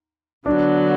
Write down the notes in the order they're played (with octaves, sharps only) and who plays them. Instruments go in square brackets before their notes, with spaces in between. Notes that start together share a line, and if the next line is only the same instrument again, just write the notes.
[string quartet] D3 F#3 B3 [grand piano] D4